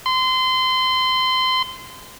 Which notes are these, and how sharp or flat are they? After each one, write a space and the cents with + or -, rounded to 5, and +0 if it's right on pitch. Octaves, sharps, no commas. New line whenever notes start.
C6 -25